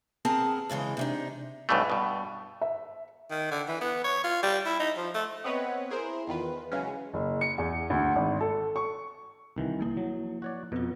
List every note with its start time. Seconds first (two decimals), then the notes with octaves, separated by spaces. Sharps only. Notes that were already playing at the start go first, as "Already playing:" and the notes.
0.25 B3 C4 G#4 A#4 A5
0.70 G#2 C#3 E3 G#3
0.97 C3 D4 D#4
1.69 B1 G2 B2 E3 A3
1.90 G2 B2
2.61 E5
3.31 D#3
3.51 D3
3.68 E3
3.81 B3
4.04 C#5
4.24 F4
4.43 G3
4.66 E4
4.80 D#4
4.97 F3
5.15 A3
5.44 B3 C4 B4 C#5 D#5 F#5
5.91 E4 G#4 A#4 C5
6.28 E2 D#3 F4 B4
6.71 C#3 E3 F#3 G#3 C#4
7.13 F#1
7.41 C#7
7.58 E2
7.90 D2
8.16 G#1
8.40 A4
8.76 C#6
9.56 C2 D#3 E3
9.79 F3 A#3 E4
9.97 F#3
10.42 F#4 C#5 D5
10.72 F2 B2 B3 F4